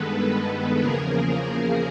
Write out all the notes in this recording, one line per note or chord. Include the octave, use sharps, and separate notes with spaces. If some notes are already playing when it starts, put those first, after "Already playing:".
Already playing: G2 D#3 G#3 B3 A4 B4
E2 C#3 F3 A#3 G#4 A#4